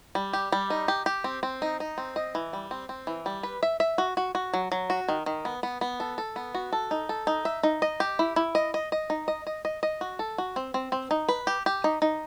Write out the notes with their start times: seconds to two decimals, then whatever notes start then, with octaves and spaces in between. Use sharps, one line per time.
0.15 G3
0.33 G4
0.52 G3
0.70 D#4
0.88 G4
1.06 G4
1.24 C4
1.43 C4
1.62 D#4
1.80 D#4
1.98 C4
2.16 D#5
2.35 E3
2.53 G3
2.71 C4
2.89 C4
3.07 E3
3.26 G3
3.43 B4
3.63 E5
3.80 E5
3.98 F#4
4.17 F#4
4.35 F#4
4.53 F#3
4.72 F#3
4.90 F#4
5.08 D#3
5.26 D#3
5.45 B3
5.63 B3
5.81 B3
6.00 A4
6.18 A4
6.36 B3
6.54 F#4
6.73 A4
6.91 D#4
7.09 A4
7.27 D#4
7.45 E5
7.63 D#4
7.82 D#5
8.00 G4
8.19 E4
8.36 E4
8.55 D#5
8.74 D#5
8.92 D#5
9.10 D#4
9.28 D#5
9.47 D#5
9.65 D#5
9.83 D#5
10.01 F#4
10.19 A4
10.38 F#4
10.56 C4
10.74 C4
10.92 C4
11.11 D#4
11.29 B4
11.47 G4
11.66 G4
11.84 D#4
12.02 D#4